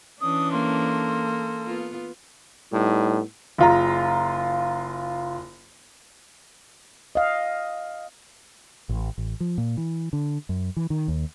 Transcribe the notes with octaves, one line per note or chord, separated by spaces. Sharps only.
E3 C#4 D4 D#6
A#3 A4 C6
B3 F4
A2 G3 B3 D#4
F#1 F4 A#5
D#5 F5
A1
A1
F3
A#2
E3
D3
F#2
E3
D#3
D#2